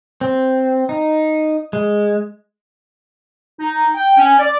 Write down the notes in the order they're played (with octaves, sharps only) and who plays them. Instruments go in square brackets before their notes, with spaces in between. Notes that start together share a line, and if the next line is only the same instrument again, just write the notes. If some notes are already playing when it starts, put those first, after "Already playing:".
[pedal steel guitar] C4
D#4
G#3
[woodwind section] D#4
G5
C#4
D5